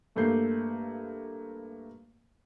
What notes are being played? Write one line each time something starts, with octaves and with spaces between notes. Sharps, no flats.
G2 A3 A#3 G6 C7